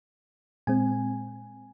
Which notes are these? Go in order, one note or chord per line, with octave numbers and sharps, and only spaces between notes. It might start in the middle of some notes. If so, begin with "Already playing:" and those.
A#2 G#3 C4 G#5